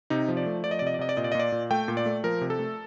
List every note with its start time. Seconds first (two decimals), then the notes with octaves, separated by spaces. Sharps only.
0.10 C3 D#4
0.28 F3
0.37 D5
0.46 A3
0.64 F3 D5
0.71 D#5
0.79 C3 D5
0.87 D#5
0.94 D5
0.99 C3 D#5
1.09 D5
1.17 A#2 D#5
1.24 D5
1.32 D#5
1.35 A#2 D5
1.52 A#2
1.71 A3 G5
1.88 A#2
1.97 D5
2.06 A3
2.24 F3 A#4
2.41 C3
2.50 A4
2.59 A3